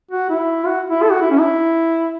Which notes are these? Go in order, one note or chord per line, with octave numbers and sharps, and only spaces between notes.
F#4
E4
F#4
E4
A4
F#4
E4
C#4
E4